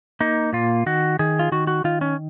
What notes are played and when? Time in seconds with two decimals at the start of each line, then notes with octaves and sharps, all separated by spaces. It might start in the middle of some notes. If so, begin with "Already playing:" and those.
0.20 A#3 D#4
0.53 A#2 F4
0.86 D#3 F#4
1.19 D#3 G#4
1.39 F4
1.52 D#3 F#4
1.67 F#4
1.84 D#3 F4
2.01 C#4